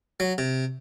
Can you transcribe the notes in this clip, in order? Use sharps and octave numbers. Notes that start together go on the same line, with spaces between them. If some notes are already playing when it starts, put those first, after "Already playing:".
F#3
C3